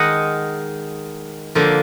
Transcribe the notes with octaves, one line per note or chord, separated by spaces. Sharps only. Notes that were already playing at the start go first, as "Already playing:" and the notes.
Already playing: D#3 G#3 D#4 D#5 F#5
D3 F3 A#3